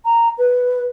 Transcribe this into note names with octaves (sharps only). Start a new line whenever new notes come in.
A#5
B4